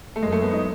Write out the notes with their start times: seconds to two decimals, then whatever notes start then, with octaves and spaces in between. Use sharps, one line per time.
0.16 A3
0.22 F#2 G#3
0.32 A3
0.42 B3
0.52 D#4